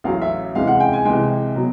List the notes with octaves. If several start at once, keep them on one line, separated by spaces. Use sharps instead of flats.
A1 A2 F#3 F5
E5
C#2 C3 E3 G#3 F5
F#5
G5
G#5
C2 C3 E3 G#3 G5
B2 F#3